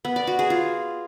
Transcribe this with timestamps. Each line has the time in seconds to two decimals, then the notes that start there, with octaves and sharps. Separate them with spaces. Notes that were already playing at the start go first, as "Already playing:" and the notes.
0.05 B3
0.16 D5
0.27 F#4
0.39 G#4
0.50 F4